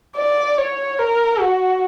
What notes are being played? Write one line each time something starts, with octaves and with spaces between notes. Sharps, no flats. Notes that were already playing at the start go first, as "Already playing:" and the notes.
D5
C#5
A#4
F#4